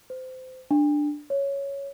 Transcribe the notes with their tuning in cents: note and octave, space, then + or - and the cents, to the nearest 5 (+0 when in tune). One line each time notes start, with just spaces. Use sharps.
C5 -25
D4 +5
C#5 +0